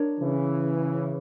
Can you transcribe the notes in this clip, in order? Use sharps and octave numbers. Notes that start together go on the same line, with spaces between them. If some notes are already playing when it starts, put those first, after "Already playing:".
Already playing: D4 A#4 C#5
C#3 E3